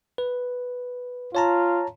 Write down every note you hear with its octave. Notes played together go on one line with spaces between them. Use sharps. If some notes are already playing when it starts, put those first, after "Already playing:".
B4
F4 C#5 A5 A#5